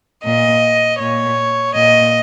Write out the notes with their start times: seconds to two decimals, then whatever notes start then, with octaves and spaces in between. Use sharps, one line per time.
0.24 A#2 D#5
0.99 A#2 C#5
1.75 A#2 D#5